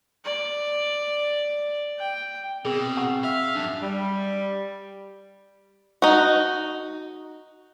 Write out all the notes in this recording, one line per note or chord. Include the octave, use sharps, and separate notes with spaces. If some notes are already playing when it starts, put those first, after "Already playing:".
D5
G5
B2 C4 G#4
F#5 C#6
E5 F5
F#2 D4
G3
D#4 F#4